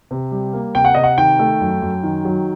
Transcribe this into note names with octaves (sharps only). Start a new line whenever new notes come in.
C3
G3
A#3
C3 G5
F#5
C3 D#5
F#5
D#3 G5
A3
F#2
F#2
D#3
F#3